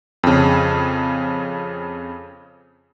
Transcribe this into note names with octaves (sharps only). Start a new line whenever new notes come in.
F2 C#3